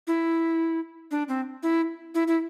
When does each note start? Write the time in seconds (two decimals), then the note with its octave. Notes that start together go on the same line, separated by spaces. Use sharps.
0.07 E4
1.11 D4
1.28 C4
1.63 E4
2.15 E4
2.28 E4